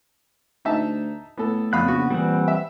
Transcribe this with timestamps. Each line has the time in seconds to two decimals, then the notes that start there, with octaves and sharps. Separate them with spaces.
0.65 D2 D#4 E5 A5
1.37 A2 B3 A4
1.73 F2 C#3 B3 F5 B5 D#6 F#6
1.88 A#1 F#4
2.10 A#2 E3 G3 C4 F#5
2.48 E5